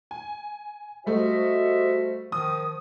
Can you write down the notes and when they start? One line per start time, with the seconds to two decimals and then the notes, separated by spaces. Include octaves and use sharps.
0.11 G#5
1.06 G3 A3 F#4 C5 D#5 E5
2.32 D#3 F3 D#6